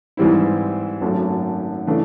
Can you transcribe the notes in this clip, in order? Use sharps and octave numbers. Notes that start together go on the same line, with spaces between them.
G#2 E3 G3 C4 E4
G#1 F#2 D#3 F#3 A3
C#3 E3 A3 D4